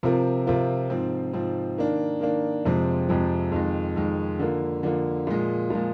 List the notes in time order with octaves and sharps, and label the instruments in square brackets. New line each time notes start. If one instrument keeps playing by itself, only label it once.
[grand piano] C3 F3 C4 F4 A#4
C3 F3 C4 F4 A#4
G#2 F3 C4
G#2 F3 C4
D#3 A#3 D4
D#3 A#3 D4
F2 C3 F3 G#3 C4
F2 C3 F3 G#3 C4
F2 D#3 G#3
F2 D#3 G#3
D3 F3 A#3
D3 F3 A#3
A#2 F3 G#3
A#2 F3 G#3